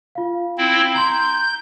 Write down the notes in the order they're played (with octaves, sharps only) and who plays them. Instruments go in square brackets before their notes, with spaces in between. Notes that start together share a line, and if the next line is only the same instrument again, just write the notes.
[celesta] F4 F5
[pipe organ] C4 E4
[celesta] A#5 C6 [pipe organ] G6